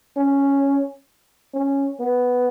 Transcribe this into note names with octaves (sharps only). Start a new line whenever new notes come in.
C#4
C#4
B3